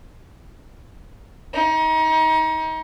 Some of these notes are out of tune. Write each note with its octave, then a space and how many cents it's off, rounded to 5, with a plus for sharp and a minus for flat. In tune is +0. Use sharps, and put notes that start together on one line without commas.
D#4 +30